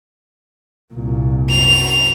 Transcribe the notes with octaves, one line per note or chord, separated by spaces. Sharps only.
C2 A#2
F#2 F7